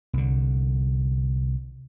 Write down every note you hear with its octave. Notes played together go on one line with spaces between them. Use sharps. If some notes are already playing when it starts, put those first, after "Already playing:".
C2 D3